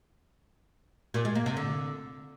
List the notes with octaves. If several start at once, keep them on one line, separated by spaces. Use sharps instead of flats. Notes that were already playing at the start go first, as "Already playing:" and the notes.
A#2
G#3
A#3
C3
D3